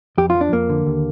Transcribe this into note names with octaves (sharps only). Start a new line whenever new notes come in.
F2 G4
F4
F3
D4
F2 A#3
D3
D#2